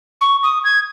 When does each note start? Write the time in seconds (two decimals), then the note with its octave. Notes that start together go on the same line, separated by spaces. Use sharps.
0.21 C#6
0.43 D#6
0.64 G#6